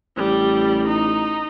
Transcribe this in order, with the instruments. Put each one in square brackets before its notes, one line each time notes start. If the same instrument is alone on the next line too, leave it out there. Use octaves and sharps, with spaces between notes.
[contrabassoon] A1 [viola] G3
[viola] D#4